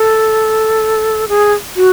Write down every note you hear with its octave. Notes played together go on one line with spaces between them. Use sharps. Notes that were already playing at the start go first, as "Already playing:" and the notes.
Already playing: A4
G#4
F#4